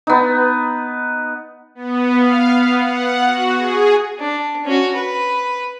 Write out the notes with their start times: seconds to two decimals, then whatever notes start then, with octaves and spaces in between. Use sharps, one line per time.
0.07 B3 D#4
1.75 B3
2.17 F5
2.52 B3
2.83 F#5
3.26 F#4
3.56 G#4
4.19 D4
4.64 C#4 F#4
4.95 B4